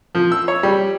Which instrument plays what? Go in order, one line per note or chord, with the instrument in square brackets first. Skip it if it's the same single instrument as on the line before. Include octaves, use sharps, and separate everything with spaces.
[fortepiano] F3
E6
C#5
G3